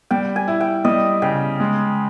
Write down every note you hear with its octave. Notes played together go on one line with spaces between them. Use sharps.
G3 G5
G#5
E4
G5
G3 D#5
C#3 G5
G#3